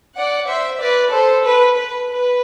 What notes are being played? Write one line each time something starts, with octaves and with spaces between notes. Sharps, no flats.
D5 F#5
C5 E5
B4 D5
A4 C5
B4
B4
B4